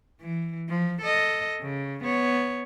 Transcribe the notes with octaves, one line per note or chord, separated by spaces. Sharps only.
E3
F3
A4 D#5
C#3
B3 C#5